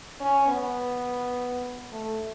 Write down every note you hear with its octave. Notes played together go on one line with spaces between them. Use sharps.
C#4
B3
A3